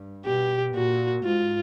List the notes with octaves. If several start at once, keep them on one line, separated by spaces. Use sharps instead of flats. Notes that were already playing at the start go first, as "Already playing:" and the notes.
Already playing: G2
B2 G4
A#2 F#4
G#2 F4